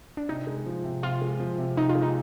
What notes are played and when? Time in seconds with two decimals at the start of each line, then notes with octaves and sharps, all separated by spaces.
0.17 D4
0.28 C3 D#4
0.47 G#3
0.66 F3
0.84 C3
1.03 C3 F4
1.21 G#3
1.40 F3
1.58 C3
1.77 C3 D#4
1.89 F4
1.95 G#3
2.02 D#4